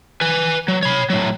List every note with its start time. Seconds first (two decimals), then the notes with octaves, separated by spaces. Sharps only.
0.21 B4 G#5
0.68 F#3
0.83 C#5 B5
1.10 A2 F#3